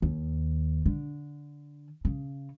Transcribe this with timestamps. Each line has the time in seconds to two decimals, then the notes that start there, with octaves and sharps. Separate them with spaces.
0.02 D#2
0.86 D3
2.05 C#3